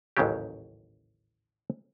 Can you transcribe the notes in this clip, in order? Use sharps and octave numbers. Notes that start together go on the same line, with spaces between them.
A1 D#2 G#2 C#3 F#3 G4